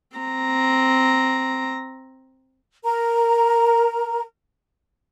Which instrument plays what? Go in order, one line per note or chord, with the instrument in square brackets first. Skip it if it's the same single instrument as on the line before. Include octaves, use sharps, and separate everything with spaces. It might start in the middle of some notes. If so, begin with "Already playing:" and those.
[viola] C4 A#5
[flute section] A#4 A#5